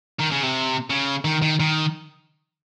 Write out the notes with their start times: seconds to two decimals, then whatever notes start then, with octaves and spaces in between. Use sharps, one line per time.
0.20 D#3
0.32 C#3
0.43 C3
0.90 C#3
1.25 D#3
1.42 D#3
1.60 D#3